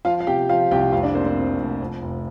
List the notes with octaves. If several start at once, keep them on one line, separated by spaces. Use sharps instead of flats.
F3 F4 F5
F5
C3 G4 G5
F3 F4 F5
C2 G4 G5
F1 F4 F5
D4 D5
A#3 C4 C5
C4 C5
F2
F1
F2
F1